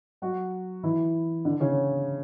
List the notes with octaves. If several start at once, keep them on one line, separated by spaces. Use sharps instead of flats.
F#3 F#4
E3 E4
D3 D4
C#3 C#4